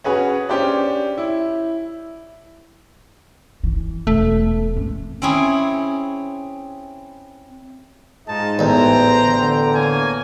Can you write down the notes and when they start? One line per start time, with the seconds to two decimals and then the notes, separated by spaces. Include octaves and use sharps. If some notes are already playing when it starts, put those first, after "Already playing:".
0.04 C#4 F#4 G#4 B4 C#5
0.49 C#4 D4 G4 C5 D5
1.18 E4
3.63 E3
4.07 E1 A3
4.76 C4 C#4
5.22 C4 C#4 E4 G#4
8.28 G#2 D#4 F4 G#4 D#5 A5
8.59 A1 E2 C5 G5 A#5
9.25 D3
9.75 A#3 C#5 G#5